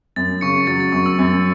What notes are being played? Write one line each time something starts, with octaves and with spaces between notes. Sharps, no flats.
F#2 A6
C#3 C#6 C#7
F#3 A6
A6
F#2 C#6
E6
F#2